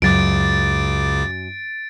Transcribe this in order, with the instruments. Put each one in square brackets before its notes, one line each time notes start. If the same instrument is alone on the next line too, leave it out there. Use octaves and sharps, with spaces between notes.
[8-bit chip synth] C#2 C#3 D6 [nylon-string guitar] F#2 [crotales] A6 D7